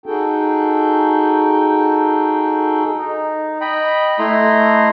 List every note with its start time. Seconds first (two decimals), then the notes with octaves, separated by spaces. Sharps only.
0.06 D#4 F#4 G#4 A4 G5
2.97 D#4
3.61 D#5 G5 B5
4.19 A3 E4 D#5 A#5 C6